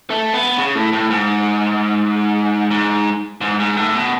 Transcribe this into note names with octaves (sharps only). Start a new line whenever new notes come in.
A3
B3
C#3
A2
A2
G#2
G#2
G#2
G#2
A2
B2